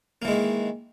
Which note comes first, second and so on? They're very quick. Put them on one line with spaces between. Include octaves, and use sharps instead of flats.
A#3 E3 G#3 D#3